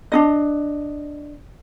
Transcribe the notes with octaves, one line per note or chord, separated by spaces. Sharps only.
D4 D#4 D#5